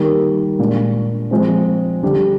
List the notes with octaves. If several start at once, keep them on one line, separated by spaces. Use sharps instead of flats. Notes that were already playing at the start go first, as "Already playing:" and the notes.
Already playing: D#3 G3 A#3
A#2 G#3 D4
F3 G#3 C4
D3 G3 D4 G4